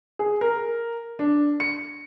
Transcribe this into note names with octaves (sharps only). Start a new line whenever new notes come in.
G#4
A#4
D4
C#7